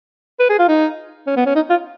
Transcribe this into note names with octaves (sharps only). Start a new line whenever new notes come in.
B4
G#4
F4
D#4
C#4
B3
C#4
D#4
F4